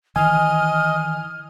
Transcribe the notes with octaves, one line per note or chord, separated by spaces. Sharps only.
D#3 E3 D#5 G#5 F6